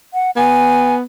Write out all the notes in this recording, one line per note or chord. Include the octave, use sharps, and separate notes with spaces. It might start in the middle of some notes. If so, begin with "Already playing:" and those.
F#5
B3 G#5